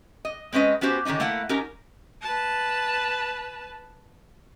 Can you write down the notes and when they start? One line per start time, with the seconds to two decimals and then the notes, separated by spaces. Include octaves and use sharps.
0.25 D#5
0.52 G#3 C4 C#4 B4 D#5
0.81 B3 C#4 F#4 G4 C5
1.05 D3 D#3 F3 C#4 D#4
1.20 A3 A#3 E4 F#5
1.49 C#4 D#4 G4 A#4
2.21 B4 A5